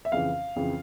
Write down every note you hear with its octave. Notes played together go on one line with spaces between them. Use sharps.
E5
F2 C#3 E3 F5
F2 C#3 E3